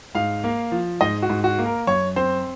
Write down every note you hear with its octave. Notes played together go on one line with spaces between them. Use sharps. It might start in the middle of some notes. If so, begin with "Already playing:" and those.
G#2 F5
A#3
F3
G#2 D#5
F#4
G#2
F#4
A#3
A#4
F#2 C#5
C4 C5